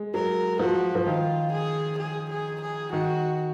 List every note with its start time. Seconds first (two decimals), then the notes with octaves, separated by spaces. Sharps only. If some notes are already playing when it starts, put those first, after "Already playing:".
Already playing: G#3
0.14 F#3 A#4
0.59 F3 F#4
0.95 F3
1.06 D#3 F4
1.52 G#4
1.99 G#4
2.30 G#4
2.61 G#4
2.93 D#3 F#4